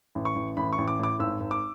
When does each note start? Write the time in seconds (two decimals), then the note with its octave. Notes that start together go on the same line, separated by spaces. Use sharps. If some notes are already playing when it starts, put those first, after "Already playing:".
0.15 A1
0.25 C#6
0.36 A1
0.57 A1 B5
0.73 C#6
0.78 A1
0.88 D6
0.99 A2 D6
1.19 G#1 E6
1.40 G#1
1.51 D6